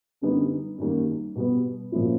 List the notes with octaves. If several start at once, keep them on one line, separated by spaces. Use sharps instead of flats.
F#2 D3 G3 B3 D#4
F#2 D#3 G3 A#3
B2 G3 B3
A#2 F3 A#3 C#4 E4